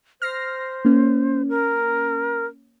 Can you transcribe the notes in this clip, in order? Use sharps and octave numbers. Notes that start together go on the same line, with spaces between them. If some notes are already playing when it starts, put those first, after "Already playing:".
C5 F6 A#6 C7
A#3 C#4
A#4